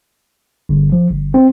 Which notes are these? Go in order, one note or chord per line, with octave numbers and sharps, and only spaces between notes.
G1
F3
G1
C4